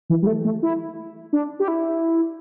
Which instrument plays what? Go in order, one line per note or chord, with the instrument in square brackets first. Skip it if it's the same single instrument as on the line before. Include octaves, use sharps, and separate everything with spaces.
[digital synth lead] E3
G3
A3
A3
E4
D4
G4
E4